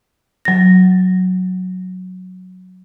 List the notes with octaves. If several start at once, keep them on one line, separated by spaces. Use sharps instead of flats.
F#3 A#6